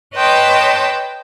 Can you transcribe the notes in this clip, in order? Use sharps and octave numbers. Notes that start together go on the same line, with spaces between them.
B4 C#5 D#5 G5 A5 C6